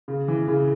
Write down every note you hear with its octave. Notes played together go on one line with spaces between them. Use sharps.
C#3
E3
C#3